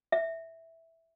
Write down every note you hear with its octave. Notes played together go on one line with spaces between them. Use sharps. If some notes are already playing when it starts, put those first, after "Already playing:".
E5